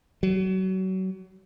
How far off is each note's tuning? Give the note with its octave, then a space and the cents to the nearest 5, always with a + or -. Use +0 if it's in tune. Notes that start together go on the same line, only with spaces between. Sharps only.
F#3 +30